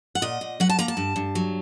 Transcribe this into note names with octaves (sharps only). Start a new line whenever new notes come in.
F#5
A#2 D#5
A#2
F#3 F#5
A5
A#3 A#5
A5
G2
G2
F#3